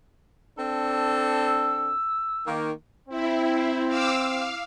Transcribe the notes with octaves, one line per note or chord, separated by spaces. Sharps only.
C4 D4 A4
E6
D#3 A#3
C4 E4
F5 D6 E6
F5